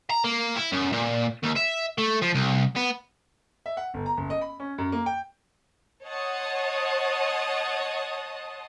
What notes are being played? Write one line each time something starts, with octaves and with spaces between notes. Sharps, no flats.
A#5
A#3
E4
F#2
A#2
D#2
E5
A3
F3
C2
B3
E5
F#5
G1
A#5
F#1
D#5
B5
C#4
F#2
A#3
G5
C#5 D#5 F#5 A5 C6 D#6